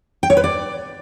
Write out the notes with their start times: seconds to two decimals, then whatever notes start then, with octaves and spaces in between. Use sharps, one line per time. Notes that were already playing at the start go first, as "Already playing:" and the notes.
0.23 G5
0.30 C#5
0.37 B4
0.44 D5